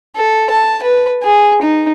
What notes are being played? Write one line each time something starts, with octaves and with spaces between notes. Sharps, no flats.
A4
A5
B4
G#4
D#4